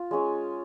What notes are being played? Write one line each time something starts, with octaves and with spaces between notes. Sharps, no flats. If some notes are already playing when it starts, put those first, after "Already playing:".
Already playing: F4
G#3 C#4 G#4 C#5